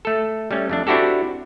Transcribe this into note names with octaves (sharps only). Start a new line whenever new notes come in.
A3 A4
G3 A3 C#4
F2 A3 D4
C4 D4 E4 F#4 G4 A4